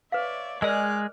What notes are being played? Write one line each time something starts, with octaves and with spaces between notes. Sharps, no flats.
B4 C#5 D5 E5 F5
G#3 G#4 A#4 D5 D#5 D6 F6 F#6